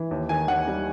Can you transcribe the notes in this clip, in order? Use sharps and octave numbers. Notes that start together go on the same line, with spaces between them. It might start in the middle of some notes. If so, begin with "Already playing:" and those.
Already playing: E3
D#2
D#3 G#5
D#2 F#5
G3